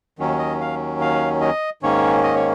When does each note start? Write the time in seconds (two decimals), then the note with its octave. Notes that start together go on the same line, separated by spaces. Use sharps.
0.19 D#2 D#3 F#3 C#4
0.39 D#5
0.61 F5
1.01 F5
1.41 D#5
1.83 G#2 D#3 A#3 C#4 C#5
2.24 D#5
2.35 C#5